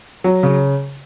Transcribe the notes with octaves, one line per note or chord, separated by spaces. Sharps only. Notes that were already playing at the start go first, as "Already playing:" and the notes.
F#3
C#3